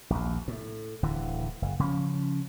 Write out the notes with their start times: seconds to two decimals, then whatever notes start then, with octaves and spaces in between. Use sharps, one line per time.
0.10 A#1 D#2
0.48 A2
1.03 D1 D3 E3
1.62 F#1
1.79 C#3 F3 C#4